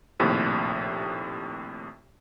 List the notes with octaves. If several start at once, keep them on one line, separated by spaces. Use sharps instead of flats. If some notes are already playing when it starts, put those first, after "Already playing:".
A#1 D#2 A2 C3